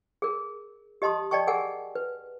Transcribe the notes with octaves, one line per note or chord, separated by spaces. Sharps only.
G#4 A#4
G4 D#5 A5 C6 D#6
D5 D#5 G5 A5 C#6
G#4 A#4 F#5 G#5
B4